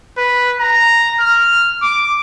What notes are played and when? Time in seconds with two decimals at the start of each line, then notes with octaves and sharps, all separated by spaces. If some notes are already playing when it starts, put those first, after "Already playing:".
0.18 B4
0.60 A#5
1.20 F6
1.82 D6